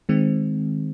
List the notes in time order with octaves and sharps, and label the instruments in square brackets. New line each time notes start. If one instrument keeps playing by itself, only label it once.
[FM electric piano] D#3 G#3 C4